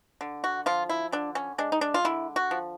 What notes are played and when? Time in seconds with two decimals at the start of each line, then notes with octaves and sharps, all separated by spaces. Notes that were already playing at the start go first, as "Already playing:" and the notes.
0.21 D3
0.44 F#4
0.66 F3 F4
0.89 E4
1.12 D3 D4
1.35 C#4
1.58 G#3 D4
1.72 D#4
1.81 D4
1.94 F4
2.05 D3 E4
2.36 F#4
2.51 F3